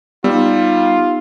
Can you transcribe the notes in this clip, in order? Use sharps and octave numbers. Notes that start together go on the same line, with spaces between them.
G3 B3 D#4 F4 G4 E6